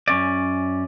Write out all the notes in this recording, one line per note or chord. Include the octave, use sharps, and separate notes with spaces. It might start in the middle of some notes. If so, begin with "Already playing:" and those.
F#2 C#4 D5